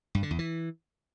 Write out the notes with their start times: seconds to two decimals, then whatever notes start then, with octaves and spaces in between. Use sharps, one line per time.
0.15 G2
0.23 D3
0.31 E2
0.39 E3